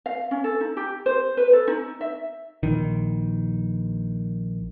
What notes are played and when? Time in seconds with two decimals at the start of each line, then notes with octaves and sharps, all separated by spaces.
0.06 F5
0.31 C#4
0.44 A4
0.61 D#4
0.77 G4
1.06 C5
1.37 B4
1.53 A4
1.68 D#4
2.01 E5
2.63 A#1 D#3